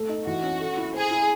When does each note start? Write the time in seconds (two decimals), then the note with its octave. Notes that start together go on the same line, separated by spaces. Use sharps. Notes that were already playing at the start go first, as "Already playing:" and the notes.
Already playing: A3 A4
0.09 D#4
0.26 E3 F#4
0.43 C#4
0.60 A4
0.77 E4
0.93 G#4 C5
1.11 E4